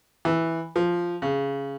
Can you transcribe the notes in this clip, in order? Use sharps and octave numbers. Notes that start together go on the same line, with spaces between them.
E3
F3
C#3